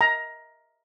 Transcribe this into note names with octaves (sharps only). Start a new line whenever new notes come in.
A#5